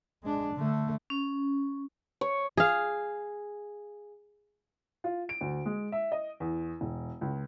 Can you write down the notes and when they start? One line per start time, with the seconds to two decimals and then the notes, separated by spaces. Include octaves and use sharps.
0.23 G#3 D4
0.54 D3 A3
1.10 C#4
2.21 C#5
2.57 G#4 F5
5.04 F4
5.29 D7
5.41 D2
5.66 G#3
5.92 E5
6.12 D#5
6.40 E2
6.81 E1
7.21 C#2